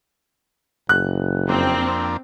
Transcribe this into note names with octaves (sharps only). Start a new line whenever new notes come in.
F#1 F#6
F2 A#3 C4 D4